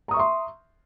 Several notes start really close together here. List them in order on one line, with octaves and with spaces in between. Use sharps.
A#5 D#6 C#6 E5 C6